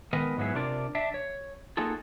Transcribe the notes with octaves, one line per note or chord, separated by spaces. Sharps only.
D#3 G#3 B3 A#4 B4 D#5
G#2 F#3 B3 E4 G#4
C3 D4 F4 A#4 D5
D4 E5
C#5
A#3 D#4 F4 F#4 G#4 A4